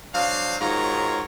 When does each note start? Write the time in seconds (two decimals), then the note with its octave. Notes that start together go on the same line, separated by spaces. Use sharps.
0.15 F#3 D4 C5 F5
0.61 G#2 D#3 F#3 F4 C#5 A#5